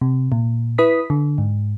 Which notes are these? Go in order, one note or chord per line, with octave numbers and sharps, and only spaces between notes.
C3
A#2
E4 B4 D#6 B6
D3
G#2